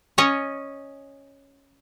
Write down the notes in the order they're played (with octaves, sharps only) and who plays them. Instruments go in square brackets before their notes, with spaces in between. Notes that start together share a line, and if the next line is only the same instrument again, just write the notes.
[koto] C#4 C#5 D#5